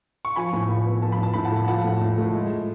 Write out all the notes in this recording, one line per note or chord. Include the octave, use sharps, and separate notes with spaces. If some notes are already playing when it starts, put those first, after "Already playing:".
C#6
F3 G#5 B5
A2
A2
B3
F3 A5
B5
A2 A5
A2 B5
F#5 A5
A3
F3 F#5 A5
A2
A2
A3
G#3